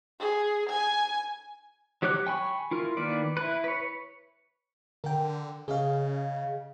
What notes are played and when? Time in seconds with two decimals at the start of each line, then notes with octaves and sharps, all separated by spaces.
0.20 G#4
0.69 G#5
2.02 F#3 G4 C#5 D6 F#6
2.27 G5 G#5 B5 C#6
2.71 E4 F4 A#4
2.97 D#3 A#3 B4 D5
3.37 E4 B4
3.64 B4 C#5
5.04 D3 A#4 G5
5.68 C#3 G#4 D#5 F5